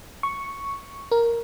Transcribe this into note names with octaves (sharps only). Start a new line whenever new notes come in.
C#6
A#4